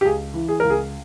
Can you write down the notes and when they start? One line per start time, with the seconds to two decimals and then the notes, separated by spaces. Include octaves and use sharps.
0.01 G4
0.05 C#2 G#4
0.34 E3
0.49 G#4
0.60 C#2 A#4
0.70 G#4